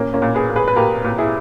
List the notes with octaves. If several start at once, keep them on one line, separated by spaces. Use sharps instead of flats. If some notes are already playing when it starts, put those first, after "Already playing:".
Already playing: A#2 A#3 C#4
A#3 C#4
A#2
G#4 B4
A#2
G#4 B4
B4
A#2 G4 A#4
A#2
E4 G#4